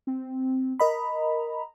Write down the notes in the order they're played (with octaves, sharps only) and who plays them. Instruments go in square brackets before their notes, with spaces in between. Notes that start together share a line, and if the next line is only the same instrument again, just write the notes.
[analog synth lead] C4
[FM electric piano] A#4 D#5 B5 [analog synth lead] A#5